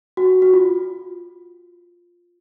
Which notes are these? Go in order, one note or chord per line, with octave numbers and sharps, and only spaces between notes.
F#4
F#4
F4